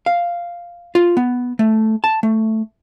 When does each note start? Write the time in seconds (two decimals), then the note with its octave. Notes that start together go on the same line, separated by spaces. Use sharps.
0.06 F5
0.95 F4
1.17 B3
1.59 A3
2.04 A5
2.23 A3